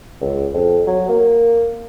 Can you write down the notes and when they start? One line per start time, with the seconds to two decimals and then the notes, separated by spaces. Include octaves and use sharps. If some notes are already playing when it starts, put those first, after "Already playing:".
0.21 C#2
0.54 F2
0.87 F#3
1.09 A#3